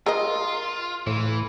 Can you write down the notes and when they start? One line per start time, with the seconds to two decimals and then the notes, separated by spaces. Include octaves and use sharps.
0.06 F4 G#4 A#4 D#5
1.07 A2 E3